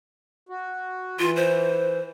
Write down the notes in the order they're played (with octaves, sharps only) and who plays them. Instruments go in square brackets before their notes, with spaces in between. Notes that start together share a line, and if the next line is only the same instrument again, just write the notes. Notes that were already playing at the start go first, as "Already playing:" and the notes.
[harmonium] F#4
[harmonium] E3 [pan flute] F4
[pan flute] C5